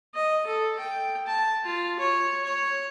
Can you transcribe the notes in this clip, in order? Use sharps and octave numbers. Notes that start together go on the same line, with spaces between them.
D#5
A4
G5
A5
F4
C#5
C#5